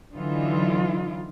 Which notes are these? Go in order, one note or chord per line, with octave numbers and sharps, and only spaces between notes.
D3 E3 F#3 D#4 F4